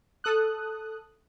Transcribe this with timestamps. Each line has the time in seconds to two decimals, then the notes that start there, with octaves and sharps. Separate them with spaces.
0.24 A4 D#6 F#6